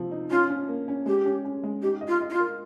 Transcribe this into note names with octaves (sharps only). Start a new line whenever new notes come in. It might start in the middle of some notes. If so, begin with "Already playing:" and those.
Already playing: C3 F3
D#4
C#4 F4
C#4
A#3
C#4
G#3 G4
C#4
C#4
G#3
D#4 G4
D#5
F4
D#5
D#4
F4
A#4